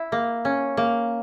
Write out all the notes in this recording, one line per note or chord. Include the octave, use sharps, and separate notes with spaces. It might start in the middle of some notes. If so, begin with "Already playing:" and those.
Already playing: E4
A#3
C#4
A#3